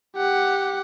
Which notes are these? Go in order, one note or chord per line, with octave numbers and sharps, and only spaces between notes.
G4 F#5